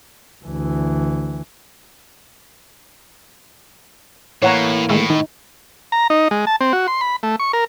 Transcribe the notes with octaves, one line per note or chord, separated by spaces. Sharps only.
D2 E3
A2 E3 A#3 C#5 F#5 A#5
A2 D#3 G#3 A3
D#3 D#4
A#5
D#4
G#3
A5
C4
F#4
C6
B5
A3
C#6
A#4